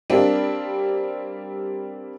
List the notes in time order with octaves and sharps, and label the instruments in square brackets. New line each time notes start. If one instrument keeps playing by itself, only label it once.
[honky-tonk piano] G3 A#3 C4 D4